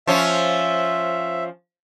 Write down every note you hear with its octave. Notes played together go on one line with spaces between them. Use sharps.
F3 C#4 E5